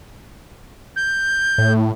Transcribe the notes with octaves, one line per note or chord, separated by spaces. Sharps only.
G6
A2